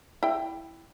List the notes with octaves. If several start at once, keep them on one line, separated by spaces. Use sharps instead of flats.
E4 G5